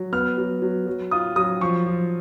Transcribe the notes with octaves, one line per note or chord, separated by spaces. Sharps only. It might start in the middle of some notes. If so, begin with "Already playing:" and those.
Already playing: F#3
B3 F6
F#3
F#3
F#3
F4 D#6
F#3 D#6
F3 C#6
F3